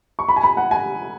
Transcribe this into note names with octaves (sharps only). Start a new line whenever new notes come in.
C#6
B5
G#5
B5
F#5
G#5